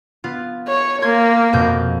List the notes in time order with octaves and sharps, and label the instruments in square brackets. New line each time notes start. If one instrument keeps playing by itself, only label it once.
[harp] B3 F4
[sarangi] C#5
[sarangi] A#3 [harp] C6 G#6
[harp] F2 B2 G6